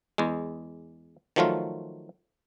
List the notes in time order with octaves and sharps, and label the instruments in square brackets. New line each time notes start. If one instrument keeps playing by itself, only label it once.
[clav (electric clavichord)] E2 G#3
D#3 F3 F#3 A3 F4